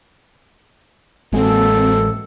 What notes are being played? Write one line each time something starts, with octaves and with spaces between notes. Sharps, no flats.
A1 F#3 G#3 A#3 C4 A4